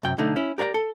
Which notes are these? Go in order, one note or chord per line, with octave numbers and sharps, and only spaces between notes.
F#2 C3 G5
B1 D3 A3 D#4
C#4 E4
G4 A#4 D5 F5 A#5
A4